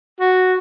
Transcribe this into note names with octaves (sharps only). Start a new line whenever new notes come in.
F#4